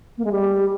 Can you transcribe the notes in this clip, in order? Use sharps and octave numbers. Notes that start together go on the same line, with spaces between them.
A#3
G#3
G3